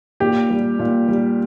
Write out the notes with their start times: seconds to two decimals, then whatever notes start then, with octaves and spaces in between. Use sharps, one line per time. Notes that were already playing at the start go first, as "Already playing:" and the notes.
0.20 A#2 G4
0.50 G3
0.79 A#2
1.08 G3